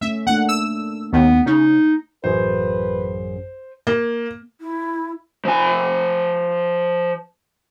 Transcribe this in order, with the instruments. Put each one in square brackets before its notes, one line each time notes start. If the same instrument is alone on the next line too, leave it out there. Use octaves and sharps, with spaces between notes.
[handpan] A3 C#4 [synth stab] E5
[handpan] A3 A#3 D4 [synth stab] F#5
[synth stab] E6
[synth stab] D#2 [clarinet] B3
[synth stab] C#3 [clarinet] D#4
[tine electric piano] A1 F#2 G#4 [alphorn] B4 [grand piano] C5
[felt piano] A#3
[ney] E4
[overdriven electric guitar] F3 G#5